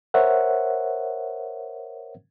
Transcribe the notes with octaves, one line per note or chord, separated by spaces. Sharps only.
A#4 C5 C#5 E5 F#5